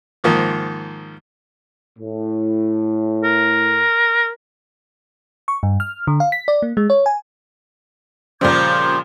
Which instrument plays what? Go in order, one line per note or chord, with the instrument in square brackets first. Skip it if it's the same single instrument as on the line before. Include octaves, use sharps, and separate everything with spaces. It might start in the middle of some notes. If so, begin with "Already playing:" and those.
[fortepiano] G#2 D#3 F3 A#3
[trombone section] A2
[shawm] A#4
[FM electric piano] C#6
G2
F6
D3
F5
B6
D5
A#3
G#3
C#5
G#5
[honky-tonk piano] A#2 C#3 [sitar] F3 G3 C4 [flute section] D6 G6 G#6